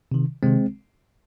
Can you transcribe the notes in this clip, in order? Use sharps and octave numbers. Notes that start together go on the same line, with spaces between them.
C3 D#3
C3 D#3 G#3 C4